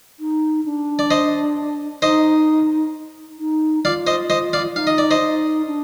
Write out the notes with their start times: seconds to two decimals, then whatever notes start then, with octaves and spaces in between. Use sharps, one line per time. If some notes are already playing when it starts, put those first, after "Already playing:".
0.20 D#4
0.65 D4
0.99 D5
1.11 C5 D#5
2.02 D#4 C5 D#5
3.39 D#4
3.85 F4 D5 F5
4.07 C5 D#5
4.30 C5 D#5
4.53 D5 F5
4.75 D#4 F5
4.87 D#5
4.98 D5
5.11 C5 D#5
5.21 D#4
5.67 D4